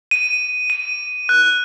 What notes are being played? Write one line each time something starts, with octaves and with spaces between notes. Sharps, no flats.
D#7
D#7
F#6